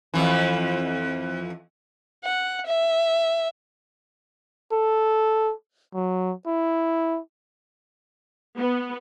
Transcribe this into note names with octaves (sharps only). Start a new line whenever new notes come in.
F2 E3
F#5
E5
A4
F#3
E4
B3